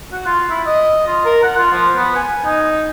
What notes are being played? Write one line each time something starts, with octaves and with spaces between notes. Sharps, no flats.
F#4
F4
E4
D#5
F4
A#4
F#5
F4
F3
B3
G#5
D#4